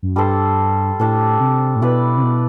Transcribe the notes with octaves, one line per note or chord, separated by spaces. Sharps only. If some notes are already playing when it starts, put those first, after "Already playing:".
F#2
G2 G3 D4 A4 C5
A2 G3 D4 A4 C5
C3
A2
B2 E4 B4 D5
C3
B2